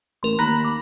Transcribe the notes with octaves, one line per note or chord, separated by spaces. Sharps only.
A1 A#4 C6
D#2 A#5 B5 F#6 A#6
D6